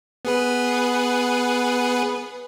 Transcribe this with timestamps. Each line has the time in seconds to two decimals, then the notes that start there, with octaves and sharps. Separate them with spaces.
0.25 B3 G#4 B4